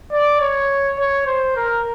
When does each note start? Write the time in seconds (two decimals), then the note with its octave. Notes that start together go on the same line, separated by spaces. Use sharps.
0.12 D5
0.41 C#5
0.98 C#5
1.26 C5
1.56 A#4